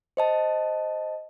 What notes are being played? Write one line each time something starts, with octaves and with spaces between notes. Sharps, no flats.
C5 D#5 A5